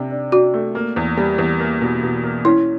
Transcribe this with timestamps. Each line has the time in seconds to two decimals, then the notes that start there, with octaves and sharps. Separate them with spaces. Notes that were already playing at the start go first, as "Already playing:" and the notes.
Already playing: C3 D4
0.11 D4
0.32 D4 F#4
0.54 A3
0.75 A#3
0.96 E2
1.17 G3
1.38 E2
1.60 A#3
1.81 B2
2.02 B2
2.24 A#3
2.45 C#4 E4